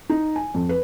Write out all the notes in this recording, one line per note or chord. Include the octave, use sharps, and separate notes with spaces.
D#4
G#5
F2
B4